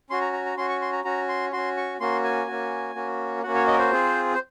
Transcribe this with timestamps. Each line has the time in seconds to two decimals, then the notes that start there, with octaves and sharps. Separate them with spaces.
0.10 C#4 F#4 C6
0.21 A#5
0.33 A#5
0.46 A#5
0.57 C#4 F#4 C6
0.69 C#6
0.82 C6
0.93 A#5
1.04 C#4 F#4 A#5
1.29 C6
1.53 C#4 F#4 C6
1.77 C#6
2.00 A#3 C#4 F#4 C6
2.24 G#5
2.47 A#3 C#4 F#4
2.95 A#3 C#4 F#4
3.43 A#3 C#4 F#4 F#5
3.55 C#5
3.67 D#5
3.74 A#4
3.78 C5
3.91 C4 F4 G#4
4.34 C5